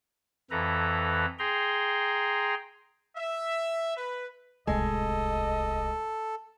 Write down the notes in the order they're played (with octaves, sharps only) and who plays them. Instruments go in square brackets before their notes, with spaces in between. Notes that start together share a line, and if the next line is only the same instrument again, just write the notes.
[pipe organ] F2 E3 A4 B4 A#5
G#4 G5 A#5 C6
[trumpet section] E5
B4
[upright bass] D1 C2 [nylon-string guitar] G#3 [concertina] A4 [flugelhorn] D#5